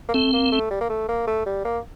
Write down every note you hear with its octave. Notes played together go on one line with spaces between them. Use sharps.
A#3
A3 C4
A#3
A3
G3
A#3
A3
A#3
A3
G3
A#3